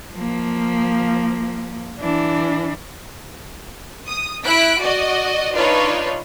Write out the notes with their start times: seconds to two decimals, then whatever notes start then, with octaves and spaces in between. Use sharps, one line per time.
0.14 F3 A#3
2.00 E3 D4
4.07 D#6
4.44 E4 F#6 B6 D7
4.79 F#4 D5 D#5
5.53 D4 D#4 F4 B4 C#5